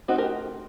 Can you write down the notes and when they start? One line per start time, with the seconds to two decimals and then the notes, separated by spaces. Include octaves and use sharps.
0.08 A3 C4 D#4 F#4
0.18 G4 A#4